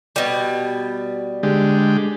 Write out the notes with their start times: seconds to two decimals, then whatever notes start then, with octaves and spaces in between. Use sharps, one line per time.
0.16 B2 G3
1.43 D3 G#3 G4